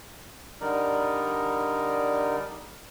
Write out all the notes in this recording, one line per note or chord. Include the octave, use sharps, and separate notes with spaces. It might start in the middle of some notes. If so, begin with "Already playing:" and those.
D3 G3 D#4 A#4 D5